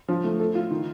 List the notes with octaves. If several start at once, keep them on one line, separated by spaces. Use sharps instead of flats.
F3
A3
A4
F4
D#3